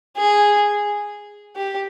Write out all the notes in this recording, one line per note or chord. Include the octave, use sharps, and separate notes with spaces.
G#4
G4